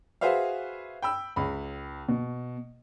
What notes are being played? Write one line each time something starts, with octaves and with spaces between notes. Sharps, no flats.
F#4 G#4 B4 C5 E5 F5
G5 B5 E6
C#2 B5
B2